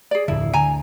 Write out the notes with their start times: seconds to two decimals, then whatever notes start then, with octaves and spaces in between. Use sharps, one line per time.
0.11 G#4 D5
0.28 D1 F2 D3 E4
0.53 D2 D3 G#5 A#5